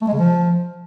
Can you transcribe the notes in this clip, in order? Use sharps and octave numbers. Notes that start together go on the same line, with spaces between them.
A3
G#3
C#3
F3